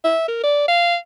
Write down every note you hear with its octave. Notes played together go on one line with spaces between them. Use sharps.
E5
A#4
D5
F5